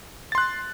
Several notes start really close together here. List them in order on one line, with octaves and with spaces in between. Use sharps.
A6 C6 F#6